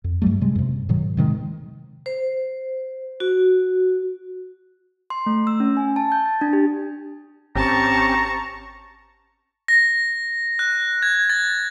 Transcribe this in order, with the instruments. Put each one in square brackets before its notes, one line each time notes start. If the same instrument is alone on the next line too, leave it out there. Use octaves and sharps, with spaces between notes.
[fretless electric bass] F2
G2 F#3 G3 A3
C3 G3 G#3
F#2 C3
G#2 B2 D#3 F#3
C3 D#3 F3 G#3
[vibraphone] C5
F#4
[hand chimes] C6
A3
E6
C#4
G#5
A5
G6
A6
D4
G4
[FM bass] G#1 [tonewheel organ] C4 C#4 G4 [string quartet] A5 C#6 [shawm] A#5
[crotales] A#6
F#6
G#6
A6